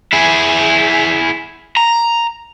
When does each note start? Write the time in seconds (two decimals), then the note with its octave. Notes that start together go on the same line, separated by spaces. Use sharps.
0.13 E4 G#4
1.77 A#5